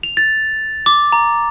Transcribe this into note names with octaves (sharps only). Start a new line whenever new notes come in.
F7
A6
D6
A#5